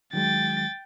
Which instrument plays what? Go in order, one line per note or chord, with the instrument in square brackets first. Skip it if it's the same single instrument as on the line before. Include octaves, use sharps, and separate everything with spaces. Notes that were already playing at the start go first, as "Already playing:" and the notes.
[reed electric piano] D#3 F#3 G#3 [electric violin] G5 A6